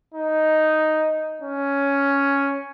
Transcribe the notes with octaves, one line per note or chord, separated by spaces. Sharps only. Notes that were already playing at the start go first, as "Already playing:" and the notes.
D#4
C#4